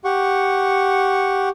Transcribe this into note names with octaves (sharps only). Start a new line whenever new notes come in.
G4 F#5 C#6